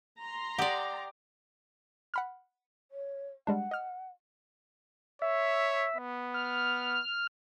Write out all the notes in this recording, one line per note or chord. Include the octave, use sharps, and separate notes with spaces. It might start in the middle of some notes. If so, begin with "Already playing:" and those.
A#5 C6
G4 D5 F#5 D#6
F#5 B5 F6
C#5
G3 G#3 D4 F#5
D#5 F6
C#5 E5
B3
F6